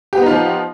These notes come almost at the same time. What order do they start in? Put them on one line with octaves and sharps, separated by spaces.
G4 B3 D#4 F4 F3